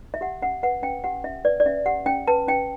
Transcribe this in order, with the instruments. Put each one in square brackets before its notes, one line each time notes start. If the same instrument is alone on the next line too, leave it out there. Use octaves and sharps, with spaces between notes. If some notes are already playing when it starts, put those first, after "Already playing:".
[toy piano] E5
G4 F#5
C#4 F#5
B4 F#5
C#4 G5
G4 F#5
C#4 E5
B4 D5
D5
C#4 E5
G4 F#5
C#4 G5
B4 A5
C#4 G5